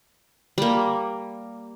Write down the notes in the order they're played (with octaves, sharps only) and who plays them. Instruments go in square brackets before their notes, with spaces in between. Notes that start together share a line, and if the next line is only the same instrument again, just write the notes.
[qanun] G3 A#3